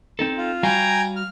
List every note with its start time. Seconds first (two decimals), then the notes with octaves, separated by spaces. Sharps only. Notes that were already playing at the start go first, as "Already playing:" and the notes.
0.19 C4 D#4 A4
0.37 F4
0.63 G3 F#4 F5 G5 G#5 A#5
1.16 F6